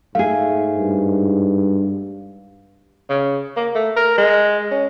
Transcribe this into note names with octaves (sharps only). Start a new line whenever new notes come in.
G#2 A3 G#4 F5
G2
C#3
A#3
A3
A#4
G#3
C#4